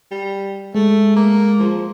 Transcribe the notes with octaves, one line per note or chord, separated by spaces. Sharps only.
G3
G#3 A3
A#3
F3